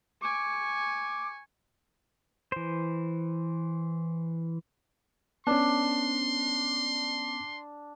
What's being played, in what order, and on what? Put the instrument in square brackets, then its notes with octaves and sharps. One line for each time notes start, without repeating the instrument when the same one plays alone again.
[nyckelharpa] G#5 C#6 [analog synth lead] D6
[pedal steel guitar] E3 C5
[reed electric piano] B3 C#4 [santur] D4 [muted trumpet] C6